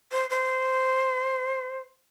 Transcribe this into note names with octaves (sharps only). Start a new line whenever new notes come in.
C5
C5